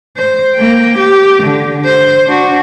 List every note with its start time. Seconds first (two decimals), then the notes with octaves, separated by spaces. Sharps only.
0.17 C5
0.55 A#3 G5
0.98 G4
1.43 D3
1.85 C5
2.26 D4 F#4